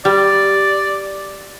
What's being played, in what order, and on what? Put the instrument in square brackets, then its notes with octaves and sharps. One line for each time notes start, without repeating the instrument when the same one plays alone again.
[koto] G3 [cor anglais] D5